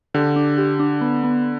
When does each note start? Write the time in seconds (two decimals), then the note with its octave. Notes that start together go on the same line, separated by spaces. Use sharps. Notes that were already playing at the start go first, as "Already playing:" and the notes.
0.14 D3 G4
0.36 D4
0.58 G4
0.79 D4
1.01 B3
1.23 B3